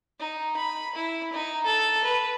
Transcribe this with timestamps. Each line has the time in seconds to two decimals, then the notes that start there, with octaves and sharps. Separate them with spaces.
0.19 D#4
0.57 B5
0.95 E4
1.33 D#4
1.65 A4
2.04 B4